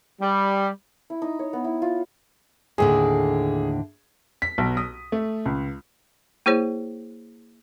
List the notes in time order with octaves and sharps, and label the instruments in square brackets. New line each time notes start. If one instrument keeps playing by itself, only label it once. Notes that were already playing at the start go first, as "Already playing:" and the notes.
[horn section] G3
[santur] E4
D#4
C#5
B3
E4
F4
[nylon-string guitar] D#2 A2 D3 [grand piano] G#4
[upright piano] B6
B1
D#6
A3
C#2
[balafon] A#3 E4 G#4 C5 C#5